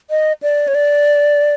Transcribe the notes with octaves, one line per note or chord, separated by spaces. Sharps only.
D#5
D5
C#5
D5